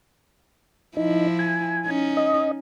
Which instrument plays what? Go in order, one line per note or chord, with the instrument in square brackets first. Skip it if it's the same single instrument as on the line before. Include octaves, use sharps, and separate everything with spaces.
[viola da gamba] F3 E4 [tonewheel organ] D#4
[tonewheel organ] G#5
[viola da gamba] C#4 D#4
[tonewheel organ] D#5